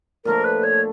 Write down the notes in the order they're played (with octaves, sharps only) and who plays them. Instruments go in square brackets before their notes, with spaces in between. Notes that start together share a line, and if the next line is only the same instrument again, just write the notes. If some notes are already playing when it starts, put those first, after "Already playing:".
[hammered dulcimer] A#2 F3 A3 D4 [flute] A#4
[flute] B4
C#5